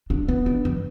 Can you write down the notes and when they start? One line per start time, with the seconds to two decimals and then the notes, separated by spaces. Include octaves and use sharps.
0.10 D4
0.28 B3 E4
0.46 D4
0.65 E3